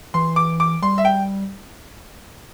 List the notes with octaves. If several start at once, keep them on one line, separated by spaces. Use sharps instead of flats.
E3 C6
D6
D6
G3 C6
E5
G5